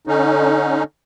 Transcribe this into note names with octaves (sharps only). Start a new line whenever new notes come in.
D3 C#4 D#4